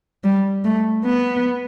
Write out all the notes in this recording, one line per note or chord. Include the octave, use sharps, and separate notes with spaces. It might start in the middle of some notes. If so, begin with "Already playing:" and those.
G3
A3
B3